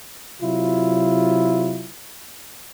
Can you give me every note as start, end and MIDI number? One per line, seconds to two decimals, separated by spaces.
0.42 1.87 48
0.42 1.87 54
0.42 1.87 64
0.42 1.87 65